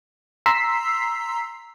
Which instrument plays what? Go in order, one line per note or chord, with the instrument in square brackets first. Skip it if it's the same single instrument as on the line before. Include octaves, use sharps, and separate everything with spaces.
[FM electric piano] A#5 C6 E6 B6 C7